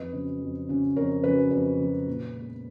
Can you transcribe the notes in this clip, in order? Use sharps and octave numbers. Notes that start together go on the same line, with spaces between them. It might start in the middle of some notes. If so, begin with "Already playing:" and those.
Already playing: F2 B4 D#5
C#3 F#3 C#4
F2
C#3 F#3 C#4
F2 A#4 C#5
C#3 F#3 C#4 B4
F2 B4
C#3 F#3 C#4
A#2
G#3 B3